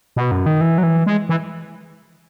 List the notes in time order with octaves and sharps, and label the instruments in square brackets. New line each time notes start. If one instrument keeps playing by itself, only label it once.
[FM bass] B2
F#2
D#3
E3
F#3
E3
G#3
E3